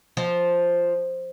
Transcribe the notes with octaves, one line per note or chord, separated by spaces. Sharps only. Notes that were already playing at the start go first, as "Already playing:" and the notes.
F3